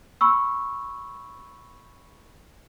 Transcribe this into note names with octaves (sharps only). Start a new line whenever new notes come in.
B5 C#6 E6